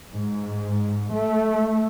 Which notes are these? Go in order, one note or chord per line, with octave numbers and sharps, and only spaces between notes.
G#2
A3